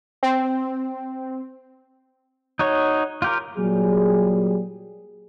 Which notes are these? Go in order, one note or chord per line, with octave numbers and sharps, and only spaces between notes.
C4
D#4 F#4 C#5
F4 G4 A#4
A#2 F#3 G3 G#4